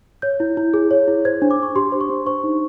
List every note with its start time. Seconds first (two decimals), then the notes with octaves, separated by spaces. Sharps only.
0.22 C#5 G6
0.40 E4
0.57 E4
0.74 G#4
0.91 C#5
1.08 E4
1.25 C5 G#6
1.42 D4
1.51 D6
1.59 D4 C#6
1.76 G4 C6
1.92 C5
2.01 C#6
2.10 D4
2.26 C5 C#6
2.44 D#4